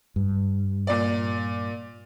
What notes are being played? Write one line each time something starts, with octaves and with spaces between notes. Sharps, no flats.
G2
A#2 D5